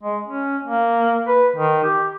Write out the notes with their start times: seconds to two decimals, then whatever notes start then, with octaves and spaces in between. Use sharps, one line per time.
0.03 G#3
0.26 C#4
0.62 A#3
1.28 B4
1.56 D#3
1.83 G4